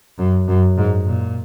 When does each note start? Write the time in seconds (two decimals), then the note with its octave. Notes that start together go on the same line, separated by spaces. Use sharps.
0.19 F#2
0.49 F#2
0.78 G#2
1.06 A#2